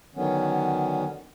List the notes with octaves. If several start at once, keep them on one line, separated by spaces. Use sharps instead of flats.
D3 D#3 F#3 B3 C#4